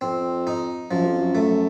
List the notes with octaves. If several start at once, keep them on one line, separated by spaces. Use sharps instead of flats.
F2 C4
D#4
F#2 F3
F2
F#2
A3